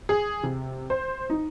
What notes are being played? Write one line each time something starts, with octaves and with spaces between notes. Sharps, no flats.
G#4
C3
C5
D#4